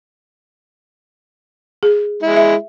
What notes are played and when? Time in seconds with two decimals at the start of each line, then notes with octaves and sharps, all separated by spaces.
1.83 G#4
2.23 G#3 E4
2.36 E5